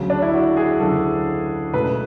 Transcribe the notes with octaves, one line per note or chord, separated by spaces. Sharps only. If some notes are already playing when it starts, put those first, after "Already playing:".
Already playing: D2 C#3 F#3
D4
E4
F#4
G#4
D2 C#3 F#3 A4
C#2 B2 A3 B4